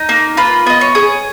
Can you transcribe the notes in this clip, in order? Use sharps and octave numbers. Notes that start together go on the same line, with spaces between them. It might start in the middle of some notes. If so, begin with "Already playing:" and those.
Already playing: D#4
A#3
F4 B4
B3 D#5
C#5
G#4